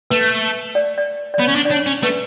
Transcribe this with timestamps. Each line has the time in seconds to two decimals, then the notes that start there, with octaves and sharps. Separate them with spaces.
0.10 A3 B4
0.75 D5
0.98 D5
1.34 D5
1.39 B3 C#5
1.48 C#4
1.55 D4
1.65 D5
1.70 D4 C#5
1.86 C#4
2.03 A3 B4